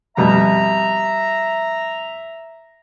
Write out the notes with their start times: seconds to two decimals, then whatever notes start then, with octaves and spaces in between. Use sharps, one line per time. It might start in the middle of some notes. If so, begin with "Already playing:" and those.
0.17 F2 B2 G3 E5 A#5